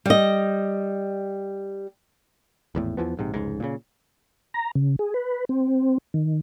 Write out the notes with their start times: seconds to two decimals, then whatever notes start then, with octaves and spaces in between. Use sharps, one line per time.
0.06 G3 D#5
2.75 G#1 E2 A2
2.97 E2 E3 F3 B3
3.17 A#1 G#2 C3
3.34 F1 C#2 G#2
3.60 A#2 C#3
4.54 A#5
4.75 C#3
4.99 G#4
5.14 B4
5.49 C4
6.14 D#3